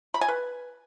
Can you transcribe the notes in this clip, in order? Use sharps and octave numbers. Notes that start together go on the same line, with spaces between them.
B5
G#5
B4